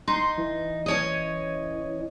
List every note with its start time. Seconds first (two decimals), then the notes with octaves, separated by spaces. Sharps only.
0.08 D#4 C6
0.38 E3
0.86 C#4 C#5 D#5